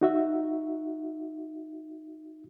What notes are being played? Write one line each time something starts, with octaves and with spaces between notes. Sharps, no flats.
D#4 F#4 E5